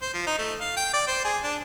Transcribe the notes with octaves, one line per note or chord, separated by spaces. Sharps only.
C5
F3
D#4
A3
F5
G5
D5
C5
G#4
D4